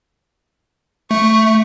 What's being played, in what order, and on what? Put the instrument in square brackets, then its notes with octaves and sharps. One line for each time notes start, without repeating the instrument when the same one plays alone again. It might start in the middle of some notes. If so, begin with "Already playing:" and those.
[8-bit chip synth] A3 [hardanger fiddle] C#6